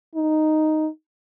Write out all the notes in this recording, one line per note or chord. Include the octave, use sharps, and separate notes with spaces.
D#4